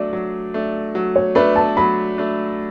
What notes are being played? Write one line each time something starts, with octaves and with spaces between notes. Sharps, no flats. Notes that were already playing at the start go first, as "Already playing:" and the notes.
Already playing: F#3 A3 D4 D5
F#3
A3 D4
F#3
C#5
A3 D4 B4
A5
F#3 B5
A3 D4